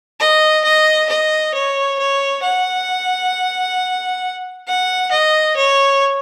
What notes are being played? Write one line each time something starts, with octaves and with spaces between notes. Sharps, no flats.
D#5
D#5
D#5
C#5
C#5
F#5
F#5
D#5
C#5